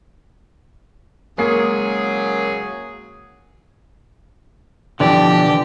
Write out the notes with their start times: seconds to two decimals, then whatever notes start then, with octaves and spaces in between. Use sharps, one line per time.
1.38 C#3 F#3 G#3 A#3 G#4 C7
5.00 B2 D3 E3 F3 G4 D5